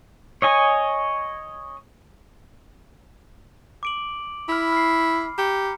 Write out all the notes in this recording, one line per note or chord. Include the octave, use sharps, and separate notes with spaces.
C#5 D#5 G#5
D6 D7 F#7
E4 B5 F6
F6 C7
G4 A#5 C#7